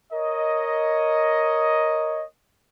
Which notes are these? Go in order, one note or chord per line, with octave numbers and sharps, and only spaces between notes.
A#4 C#5 D#5